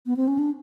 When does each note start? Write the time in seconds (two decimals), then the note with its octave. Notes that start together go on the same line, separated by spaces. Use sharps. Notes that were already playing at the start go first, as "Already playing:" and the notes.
0.06 B3
0.17 C4
0.28 C#4
0.38 D4